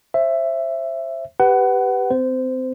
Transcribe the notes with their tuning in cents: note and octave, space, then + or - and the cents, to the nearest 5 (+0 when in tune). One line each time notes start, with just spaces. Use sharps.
C5 +30 E5 +10
G4 +0 B4 +5 F#5 +25
C4 -25 C5 -20